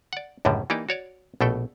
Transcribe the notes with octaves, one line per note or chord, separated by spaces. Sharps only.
D5 F#5
C#2 F#2 A2 D3 G3
E3 A#3 D#4 G4 D5
F#4 C#5 D5
A#1 B2 A3 A4 G5